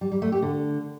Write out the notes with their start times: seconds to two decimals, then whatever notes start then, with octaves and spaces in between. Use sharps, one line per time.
0.01 G3
0.12 G3
0.22 A3
0.32 G4
0.42 D3